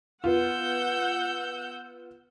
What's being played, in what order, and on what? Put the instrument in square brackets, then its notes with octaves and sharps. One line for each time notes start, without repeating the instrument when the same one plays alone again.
[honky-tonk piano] B3 F4 [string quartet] F#5 E6 G6